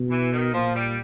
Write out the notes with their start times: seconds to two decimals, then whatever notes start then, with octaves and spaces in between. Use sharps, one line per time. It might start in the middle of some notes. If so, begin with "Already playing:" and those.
Already playing: B2
0.10 E3
0.32 D#3
0.53 A#2 F3
0.75 G3